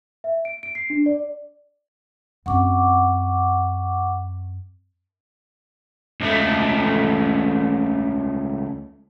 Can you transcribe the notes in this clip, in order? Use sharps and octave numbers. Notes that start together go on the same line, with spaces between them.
E5
D7
D7
C7
D4
D5
F#2 C4 F#5 C#6 D6
C#2 A3